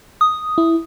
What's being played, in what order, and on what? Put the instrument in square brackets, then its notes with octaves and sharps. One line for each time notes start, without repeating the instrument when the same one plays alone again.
[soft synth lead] D#6
[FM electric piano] E4